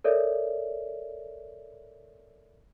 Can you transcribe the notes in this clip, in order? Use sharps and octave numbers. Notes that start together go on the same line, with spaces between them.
A4 A#4 C#5 D5 E5